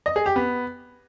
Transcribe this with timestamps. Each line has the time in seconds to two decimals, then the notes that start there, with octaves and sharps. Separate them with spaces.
0.06 D#5
0.16 G#4
0.26 G4
0.36 B3